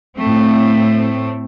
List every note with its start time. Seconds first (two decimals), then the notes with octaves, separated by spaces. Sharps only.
0.17 A2 A3 C4